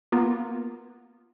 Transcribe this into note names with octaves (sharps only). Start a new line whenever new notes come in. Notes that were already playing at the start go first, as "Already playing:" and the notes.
A#3 B3 F4 A#4